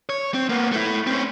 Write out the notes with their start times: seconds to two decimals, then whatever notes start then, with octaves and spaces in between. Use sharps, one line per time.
0.09 C#5
0.34 C4
0.49 A#3 B3
0.72 A3 E4
1.07 C4 C#4